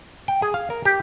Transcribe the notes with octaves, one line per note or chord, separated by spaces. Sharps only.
G5
G#4
F5
A#4
G4